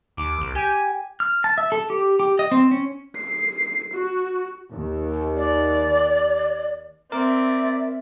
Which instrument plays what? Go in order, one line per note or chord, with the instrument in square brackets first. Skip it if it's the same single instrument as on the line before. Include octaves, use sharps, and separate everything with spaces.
[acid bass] D#2 [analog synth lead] D6
[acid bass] C2
[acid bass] G4 [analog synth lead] G#5
[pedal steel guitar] F6
A5
E5
A4
G4
G4
D#5
C4
C#4
[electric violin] C7
F#4
[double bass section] D#2
[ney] D5
[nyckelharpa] C4 [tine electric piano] A#4 [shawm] D5 [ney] E5